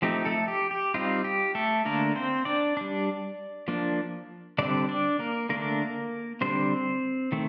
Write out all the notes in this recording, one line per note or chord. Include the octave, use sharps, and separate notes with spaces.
F3 A3 C4 D#4 G4
A3 A4
G4
G4
G3 C4 D#4 F4
G4
A3 A4
D3 A3 A#3 D4 A#4
C4 C5
D4 D5
G3 D4
F3 A#3 D4
D3 G3 C4 D4 D5
D4 D5
A#3 A#4
D3 A3 A#3 D4 A#4
D3 G3 C4 D4 C5
D#3 A3 C4